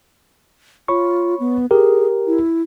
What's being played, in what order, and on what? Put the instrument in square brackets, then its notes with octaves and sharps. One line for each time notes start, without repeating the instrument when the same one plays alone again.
[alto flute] F4 [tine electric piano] C#5 B5 C#6
[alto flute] B3
[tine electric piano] G4 A#4 [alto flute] G#4
[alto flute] E4